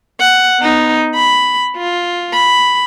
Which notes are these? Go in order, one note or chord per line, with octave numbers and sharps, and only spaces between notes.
F#5
B3 D#4
B5
F4
B5